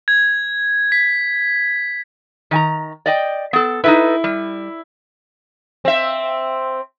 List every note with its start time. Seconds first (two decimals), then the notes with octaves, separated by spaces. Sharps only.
0.08 G#6
0.92 B6
2.51 D#3 G#5 A#5
3.06 D5 D#5 G5
3.53 B3 A4
3.84 D#4 E4 A4 B4
4.24 G3
5.85 C4 E5